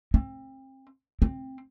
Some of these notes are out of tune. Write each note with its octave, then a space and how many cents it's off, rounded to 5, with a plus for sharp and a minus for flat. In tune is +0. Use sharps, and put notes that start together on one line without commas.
C4 +30
C4 +15